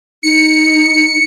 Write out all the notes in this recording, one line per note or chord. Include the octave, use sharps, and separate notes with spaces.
D#4 C#7